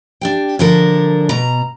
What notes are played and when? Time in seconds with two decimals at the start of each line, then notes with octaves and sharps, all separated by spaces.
0.21 D4 G4 G5
0.59 D3 F3 D4 A4 A#4
1.29 B2 A#5